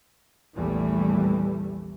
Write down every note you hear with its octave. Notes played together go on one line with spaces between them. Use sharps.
A#1 E2 E3 G3 A3